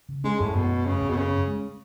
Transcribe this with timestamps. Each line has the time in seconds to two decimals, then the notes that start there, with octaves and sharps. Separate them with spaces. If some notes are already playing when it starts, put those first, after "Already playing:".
0.09 C#3
0.24 G#3 C#4
0.39 F#2 A2
0.55 F#2 B2
0.70 A3
0.85 C#3 C#4
1.01 F#2
1.10 B2
1.16 C#3 C#4
1.32 C#4
1.47 G#3